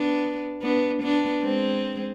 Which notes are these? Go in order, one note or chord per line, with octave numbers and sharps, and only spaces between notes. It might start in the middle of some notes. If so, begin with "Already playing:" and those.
Already playing: B3 D4
B3 D4
B3 D4
G#3 C4